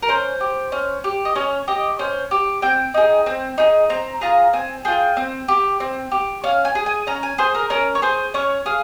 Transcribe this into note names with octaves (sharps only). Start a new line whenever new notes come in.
A#4
C#4 C5
G4
C#4
G4
D#5
C#4 C#5
G4 D#5
C#4 C5
G4
C4 G5
D#4 G#4
C4
D#4 G#4
C4 A#5
F4 G#4 A#5
C4 G#5
F4 G#4 G5
C4
G4
C4
G4
C#4 F5
G#5
G#4
G#5
C#4 A#5
G#5
G#4 C5
A#4
C#4 A#4
C#5
G#4 C5
C#4 C#5
G#4 F5